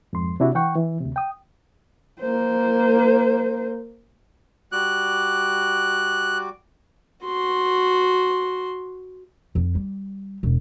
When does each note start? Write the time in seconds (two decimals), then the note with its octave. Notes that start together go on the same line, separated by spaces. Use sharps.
0.13 F2 G#2 C6
0.40 C3 D4 E4 F#4
0.55 E3 F#5 G5 C#6
0.76 E3
1.01 D2 C3
1.16 G5 D#6
2.21 A#3 C5
4.72 G3 F#4 D6 F#6
7.25 F#4 C6
9.55 F2
9.75 G3
10.43 E1